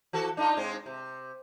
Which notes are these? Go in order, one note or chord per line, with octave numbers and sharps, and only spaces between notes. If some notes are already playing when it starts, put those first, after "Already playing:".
E3 F#4 A4
D4 D#4 F4
G#2 G#3 C4
C3